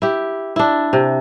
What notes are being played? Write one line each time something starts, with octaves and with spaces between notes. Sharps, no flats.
E4 G4
D4 E4
C3